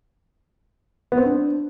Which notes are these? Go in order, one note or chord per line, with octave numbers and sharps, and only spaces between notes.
B3
C4
D4